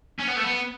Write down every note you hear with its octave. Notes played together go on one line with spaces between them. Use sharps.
C#4
B3
A3
B3